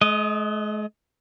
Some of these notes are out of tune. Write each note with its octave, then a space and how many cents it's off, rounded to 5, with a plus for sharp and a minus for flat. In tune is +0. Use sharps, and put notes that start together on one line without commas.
G#3 +45 D#5 +0